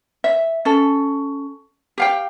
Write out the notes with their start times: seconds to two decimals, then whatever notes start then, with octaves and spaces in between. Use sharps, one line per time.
0.24 E5
0.65 C#4 A4
1.98 G4 F5 G5